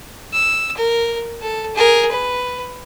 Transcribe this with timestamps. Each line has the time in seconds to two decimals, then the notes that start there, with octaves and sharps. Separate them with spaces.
0.33 E6
0.77 A#4
1.42 A4
1.75 G#4 A#4
2.11 B4